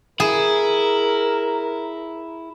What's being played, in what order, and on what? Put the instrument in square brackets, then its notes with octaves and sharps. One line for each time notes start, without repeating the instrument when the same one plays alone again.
[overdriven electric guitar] E4 [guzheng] G#4 [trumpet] A#4